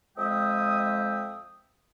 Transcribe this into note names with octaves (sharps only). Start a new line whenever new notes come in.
F2 G#3 E5 G5 D#6